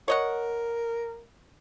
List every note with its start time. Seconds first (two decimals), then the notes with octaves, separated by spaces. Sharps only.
0.08 A#4 C#5 D#5 F#5